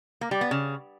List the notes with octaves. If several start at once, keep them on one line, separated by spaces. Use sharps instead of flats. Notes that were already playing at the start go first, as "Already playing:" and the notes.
A#3
G3
B3
C#3